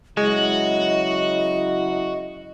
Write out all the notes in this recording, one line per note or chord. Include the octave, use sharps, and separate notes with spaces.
C#3 F#3 G#3 E4 F#4 D#5